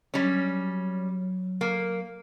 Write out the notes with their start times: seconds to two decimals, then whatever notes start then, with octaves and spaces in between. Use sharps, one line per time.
0.14 F#3 G3 C#4
1.61 A#3